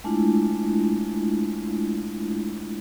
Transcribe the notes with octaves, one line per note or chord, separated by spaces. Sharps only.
G#3 A3 D4 E4 F4